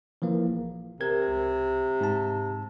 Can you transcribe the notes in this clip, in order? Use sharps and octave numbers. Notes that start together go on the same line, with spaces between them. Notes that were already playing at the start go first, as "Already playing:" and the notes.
E3 F3 A#3
A#1
C3 A#4 G#6
C#2
G#2 A5